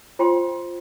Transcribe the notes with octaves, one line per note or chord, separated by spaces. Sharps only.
F4 C5 G5 C6